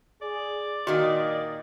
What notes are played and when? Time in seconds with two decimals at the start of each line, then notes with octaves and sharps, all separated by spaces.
0.22 G#4 D5
0.87 A#2 D#3 A#3 F#4 D#5